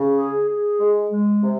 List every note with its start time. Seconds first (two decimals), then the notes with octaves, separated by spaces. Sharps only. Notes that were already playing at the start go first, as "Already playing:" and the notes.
Already playing: C#3
0.17 G#4
0.48 G#4
0.80 G#3
1.11 G#3
1.43 C3